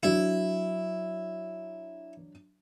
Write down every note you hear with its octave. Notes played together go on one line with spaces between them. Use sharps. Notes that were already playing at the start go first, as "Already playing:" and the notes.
F#3 D4 E4